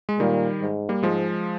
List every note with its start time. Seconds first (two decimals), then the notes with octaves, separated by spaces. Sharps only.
0.09 G#3
0.19 A#2 D#3 G3
0.61 G#2
0.89 G3 A#3
1.03 G#2 F3 G#3